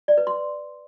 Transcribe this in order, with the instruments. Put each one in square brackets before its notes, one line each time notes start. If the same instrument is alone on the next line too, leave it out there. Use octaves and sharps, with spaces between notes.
[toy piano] D5
B4
C6